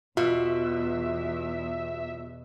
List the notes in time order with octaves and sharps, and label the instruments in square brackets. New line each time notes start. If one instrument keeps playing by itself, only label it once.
[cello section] E2 [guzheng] B2 [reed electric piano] F4 [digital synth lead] E5